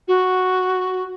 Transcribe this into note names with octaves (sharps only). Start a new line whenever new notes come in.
F#4